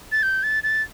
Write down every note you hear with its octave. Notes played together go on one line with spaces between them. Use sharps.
A6
G6
A6
A6